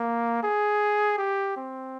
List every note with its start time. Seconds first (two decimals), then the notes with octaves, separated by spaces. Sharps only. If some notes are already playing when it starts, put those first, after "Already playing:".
Already playing: A#3
0.44 G#4
1.18 G4
1.57 C4